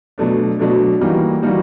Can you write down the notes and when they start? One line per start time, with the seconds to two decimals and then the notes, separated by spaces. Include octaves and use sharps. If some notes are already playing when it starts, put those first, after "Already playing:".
0.18 B2 F#3 A3 D4
0.59 B2 F#3 A3 D4
1.01 E3 G3 A#3 D#4 F#4
1.42 E3 G3 A#3 D#4 F#4